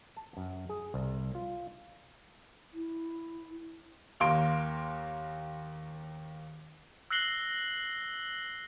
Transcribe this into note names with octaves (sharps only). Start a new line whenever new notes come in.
A5
F#2
G#4
C2
F4
E4
D#2 A#3 C6 D7
E6 F#6 A#6 C7 F#7 G7